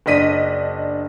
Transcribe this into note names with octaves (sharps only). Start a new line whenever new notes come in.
F#1 D4 D#5 B6 D#7